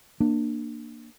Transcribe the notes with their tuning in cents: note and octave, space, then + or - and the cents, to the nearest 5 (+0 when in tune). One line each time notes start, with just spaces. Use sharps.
A#3 +0 D4 +20